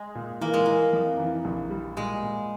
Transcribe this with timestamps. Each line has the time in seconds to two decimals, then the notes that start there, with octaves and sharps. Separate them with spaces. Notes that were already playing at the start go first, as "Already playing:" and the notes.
Already playing: G#3
0.15 A#2
0.41 E3 A#3
0.54 G#3
0.66 E3 A#3
0.93 F2
1.19 E3
1.45 A#1
1.70 G3
1.97 A#2 G#3
2.23 A#2